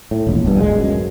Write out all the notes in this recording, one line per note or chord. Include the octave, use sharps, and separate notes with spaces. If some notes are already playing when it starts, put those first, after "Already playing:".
A2
E1 A#1
G1 G2
D1 G#3
F#2